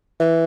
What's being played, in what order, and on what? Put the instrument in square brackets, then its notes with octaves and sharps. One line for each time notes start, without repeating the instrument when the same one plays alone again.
[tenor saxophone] E3